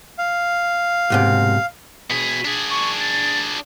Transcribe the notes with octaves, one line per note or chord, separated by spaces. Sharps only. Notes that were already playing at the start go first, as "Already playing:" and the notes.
F5
B1 G#2 C3
B2 G#4 B6
D4 G#4
C#6
A6